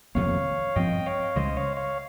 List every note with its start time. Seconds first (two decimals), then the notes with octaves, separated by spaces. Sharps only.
0.15 F2 C3 D#3 A#3 C#5 F5
0.76 G2 F3 C4 D#5 G5
1.06 C#5 F5
1.36 C#2 C#3 G#3 C5 D#5
1.56 C#5 F5
1.77 C#5 F5